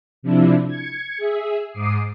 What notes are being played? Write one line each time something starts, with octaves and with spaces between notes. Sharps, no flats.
C3 F3 D4 E4
G#6 C#7
G#4 E5
G#2 D6 D#6 C7